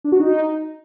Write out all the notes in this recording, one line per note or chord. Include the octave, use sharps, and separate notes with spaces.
D4
F#4
D#4